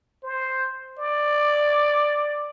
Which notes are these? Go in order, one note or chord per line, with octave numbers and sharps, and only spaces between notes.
C5
D5